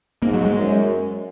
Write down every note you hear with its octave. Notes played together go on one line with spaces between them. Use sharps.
G#2 A#3
F#3
G#3
F#2